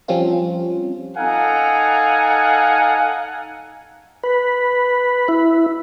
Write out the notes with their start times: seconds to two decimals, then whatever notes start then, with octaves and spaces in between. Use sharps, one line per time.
0.08 F3 G3 C4 C#4 F4
1.17 D#4 A4 F5 F#5 G#5 A#5
4.24 B4
5.28 E4